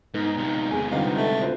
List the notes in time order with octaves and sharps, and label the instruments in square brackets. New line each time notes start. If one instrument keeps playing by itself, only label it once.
[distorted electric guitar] G#2 [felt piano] B3 [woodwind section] D#4
[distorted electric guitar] C#2 C3
[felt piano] E2 [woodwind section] G#4
[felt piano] D3 G3 [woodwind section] F3 B3 D#4 [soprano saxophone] F5
[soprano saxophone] A3
[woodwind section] D2 [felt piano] F4 B4 C5